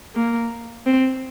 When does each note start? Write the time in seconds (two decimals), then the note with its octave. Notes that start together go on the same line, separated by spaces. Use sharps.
0.15 A#3
0.86 C4